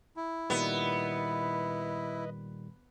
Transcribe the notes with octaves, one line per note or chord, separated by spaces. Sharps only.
E4
A#2 D#3 G3 B3 B4 D#5